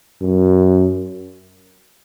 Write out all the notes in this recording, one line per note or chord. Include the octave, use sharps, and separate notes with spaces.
F#2